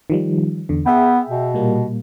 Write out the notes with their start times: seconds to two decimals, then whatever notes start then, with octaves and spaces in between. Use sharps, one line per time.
0.10 D#3 F3 G3
0.69 E2 D3
0.86 B3 G#4 E5 G5
1.29 B2
1.54 A#2 G3 A#3